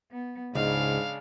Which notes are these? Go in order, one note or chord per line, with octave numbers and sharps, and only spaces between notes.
B3
C#2 G#2 C#3 G#3 D4 F5